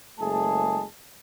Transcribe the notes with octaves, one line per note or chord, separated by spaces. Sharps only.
F#1 G#3 A3 G#4 A5